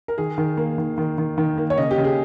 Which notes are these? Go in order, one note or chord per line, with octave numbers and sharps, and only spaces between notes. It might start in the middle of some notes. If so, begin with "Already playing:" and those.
A#4
D#3 G#4
D#3
A#3
D#3
D#3
D#3
D#3
A#3
C#5
C#3 D#5
G4
C#3
G#4